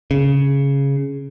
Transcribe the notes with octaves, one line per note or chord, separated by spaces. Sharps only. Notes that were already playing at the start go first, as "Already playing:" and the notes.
C#3